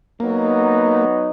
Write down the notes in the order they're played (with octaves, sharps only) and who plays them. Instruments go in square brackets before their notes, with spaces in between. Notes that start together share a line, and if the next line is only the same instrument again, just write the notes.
[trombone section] F#3 B3 D#4 [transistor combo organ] A#3